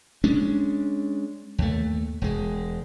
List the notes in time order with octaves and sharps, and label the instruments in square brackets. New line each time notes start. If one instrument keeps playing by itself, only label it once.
[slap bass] G#3 C#4 D4
D#2 A3
E1 G#3